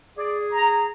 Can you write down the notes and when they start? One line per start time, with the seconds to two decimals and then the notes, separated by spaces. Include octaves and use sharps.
0.18 G#4 D5
0.52 A#5